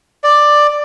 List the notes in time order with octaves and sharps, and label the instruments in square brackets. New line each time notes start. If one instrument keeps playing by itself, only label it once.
[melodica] D5